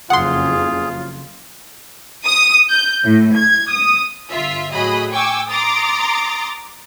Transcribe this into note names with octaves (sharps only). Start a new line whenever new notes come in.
F#1 F2 C#3 F4 G#4 F#5 C6
D#6
G6
A2
G#6
D#6
G1 F4 E5
A2 F#3 G#4 D#5 B5
G5 G#5 C#6 D6 E6
A#5 C6 D6 D#6 A6